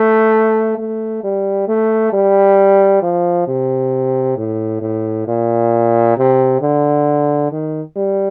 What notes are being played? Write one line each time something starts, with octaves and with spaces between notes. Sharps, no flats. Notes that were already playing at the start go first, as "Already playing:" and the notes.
Already playing: A3
A3
G3
A3
G3
F3
C3
A2
A2
A#2
C3
D3
D#3
G3